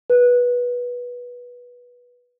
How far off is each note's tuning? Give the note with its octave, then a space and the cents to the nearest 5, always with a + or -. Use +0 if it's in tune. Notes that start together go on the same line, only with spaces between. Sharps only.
B4 -15